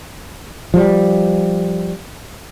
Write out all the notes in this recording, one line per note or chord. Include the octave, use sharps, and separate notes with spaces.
F3 G3